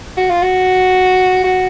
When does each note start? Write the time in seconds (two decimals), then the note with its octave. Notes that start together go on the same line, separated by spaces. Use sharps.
0.17 F#4
0.30 F4
0.43 F#4
1.44 F#4